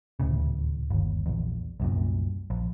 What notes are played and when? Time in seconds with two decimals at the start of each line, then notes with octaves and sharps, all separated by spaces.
0.20 D#1 D2 A2 C#3
0.90 G1 D#2
1.26 A#1 E2
1.80 C2 F#2 A#2
2.50 A#1